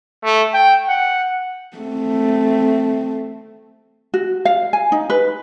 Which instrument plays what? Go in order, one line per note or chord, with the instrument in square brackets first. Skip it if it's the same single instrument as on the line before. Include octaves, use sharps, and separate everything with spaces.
[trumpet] A3
G5
F#5
[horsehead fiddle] A3 C4
[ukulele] F#4
F5
G#5
D#4
B4